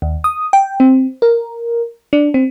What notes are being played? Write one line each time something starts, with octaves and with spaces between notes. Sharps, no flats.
D#2
D#6
G5
C4
A#4
D4
C4